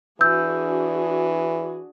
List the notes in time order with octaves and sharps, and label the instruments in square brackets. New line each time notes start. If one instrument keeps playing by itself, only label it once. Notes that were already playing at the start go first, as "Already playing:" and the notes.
[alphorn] E3 [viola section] D4 F#4 G#4 [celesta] E6 G6